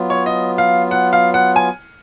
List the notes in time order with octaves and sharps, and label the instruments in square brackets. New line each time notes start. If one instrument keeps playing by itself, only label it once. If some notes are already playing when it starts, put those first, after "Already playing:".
Already playing: [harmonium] F#3 B3 F4
[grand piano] C#5
D#5
F5
F#5
F5
F#5
G#5